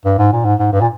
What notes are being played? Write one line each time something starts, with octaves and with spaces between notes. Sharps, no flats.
G2
G#2
A#2
G#2
G#2
G2
A#2